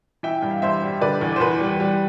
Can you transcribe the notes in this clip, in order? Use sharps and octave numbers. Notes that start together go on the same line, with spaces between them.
E3 E5 G5
G2
F5
G2 C5 E5
G3
D3 B4 D5
E2
C5
E2 B4
G3
G3